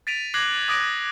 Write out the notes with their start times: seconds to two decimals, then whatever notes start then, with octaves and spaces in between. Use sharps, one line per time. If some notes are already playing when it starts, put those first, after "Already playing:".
0.07 A6 B6 D7 D#7 F7
0.34 D6 F#6 G#6 A#6 C7 F#7
0.68 D6 D#6 F#6 A#6 D7 D#7